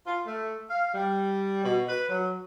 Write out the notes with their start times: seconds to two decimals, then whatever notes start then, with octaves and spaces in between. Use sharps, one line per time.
0.05 F4
0.24 A3
0.69 F5
0.93 G3
1.63 B2
1.88 B4
2.08 F#3